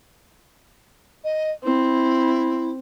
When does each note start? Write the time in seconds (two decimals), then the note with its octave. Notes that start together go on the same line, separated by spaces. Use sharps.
1.24 D#5
1.64 C4 E4